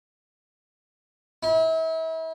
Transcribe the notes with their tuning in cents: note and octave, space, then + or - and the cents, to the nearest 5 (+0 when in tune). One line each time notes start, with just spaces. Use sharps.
E4 -35